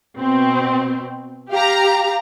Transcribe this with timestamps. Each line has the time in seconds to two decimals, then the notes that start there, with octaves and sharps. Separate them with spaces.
0.17 B2 C4
1.51 G4 F5 A#5